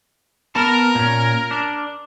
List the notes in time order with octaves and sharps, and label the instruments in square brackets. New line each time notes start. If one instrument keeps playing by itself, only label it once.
[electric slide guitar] B3 A5 [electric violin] A#4
[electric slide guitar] A#2 C#4
D4